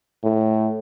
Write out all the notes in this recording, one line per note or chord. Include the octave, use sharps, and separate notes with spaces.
A2